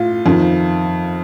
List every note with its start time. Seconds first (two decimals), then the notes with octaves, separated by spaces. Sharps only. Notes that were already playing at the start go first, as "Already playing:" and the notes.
Already playing: A2 F4
0.26 F2 D#3